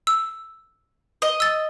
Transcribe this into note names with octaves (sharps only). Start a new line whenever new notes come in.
E6
D#5
E6 A6